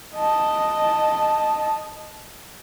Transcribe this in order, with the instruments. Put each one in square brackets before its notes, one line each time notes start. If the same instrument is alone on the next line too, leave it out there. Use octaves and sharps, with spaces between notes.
[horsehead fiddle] D#5 A5